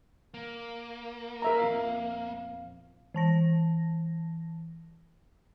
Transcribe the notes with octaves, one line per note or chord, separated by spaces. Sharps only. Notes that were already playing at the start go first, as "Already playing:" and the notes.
A#3
A#4 E5 A#5
F2 A#2 F5
E3 A5 A#6